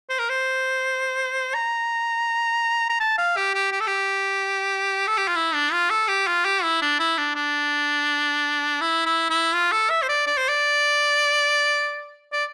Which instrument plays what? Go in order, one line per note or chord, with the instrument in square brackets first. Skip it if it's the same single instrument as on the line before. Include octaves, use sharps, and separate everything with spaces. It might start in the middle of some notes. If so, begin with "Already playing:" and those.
[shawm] C5
A#4
C5
A#5
A#5
A5
F5
G4
G4
G4
A4
G4
A4
G4
F4
E4
D4
F4
A4
G4
F4
G4
E4
D4
E4
D4
D4
E4
E4
E4
F4
A4
E5
C5
D5
D5
C5
D5
D5